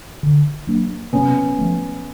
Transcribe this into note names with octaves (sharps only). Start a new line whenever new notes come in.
D3
F#3 A#3 D4
C3 B3 C#4
F3 A3